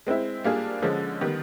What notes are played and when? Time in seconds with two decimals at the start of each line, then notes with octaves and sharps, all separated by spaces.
0.07 G#3 C4 E4
0.44 G3 A#3 D4 F4 G#4
0.82 D3 F3 G#3 C#4
1.21 D#3 G3 B3